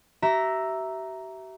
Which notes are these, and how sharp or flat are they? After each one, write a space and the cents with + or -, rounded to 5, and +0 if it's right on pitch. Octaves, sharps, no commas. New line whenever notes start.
G4 -45 E5 +0 A#5 +0